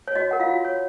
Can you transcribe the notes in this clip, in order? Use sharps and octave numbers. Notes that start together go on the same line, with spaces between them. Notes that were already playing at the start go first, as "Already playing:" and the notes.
C#5
F#4 D#5
A#4 F#5
F4 F5
F#4
C#5